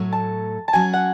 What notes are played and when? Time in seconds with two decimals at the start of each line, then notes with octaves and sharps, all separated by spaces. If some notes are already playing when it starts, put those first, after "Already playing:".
Already playing: A2 F#3 A3
0.12 A5
0.68 A5
0.73 F#3 C#4 F#4 G#5
0.93 F#5